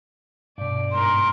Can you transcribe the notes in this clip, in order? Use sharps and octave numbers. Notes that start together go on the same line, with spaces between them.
G2 B2 D5
G#2 A#4 C6